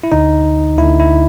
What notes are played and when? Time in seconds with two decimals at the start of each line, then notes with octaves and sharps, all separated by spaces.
0.04 E4
0.12 D2 D3 D#4
0.78 D2 D3 E4
1.00 E4